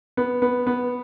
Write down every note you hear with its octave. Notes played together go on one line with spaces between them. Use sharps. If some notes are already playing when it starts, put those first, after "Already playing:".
B3
B3
B3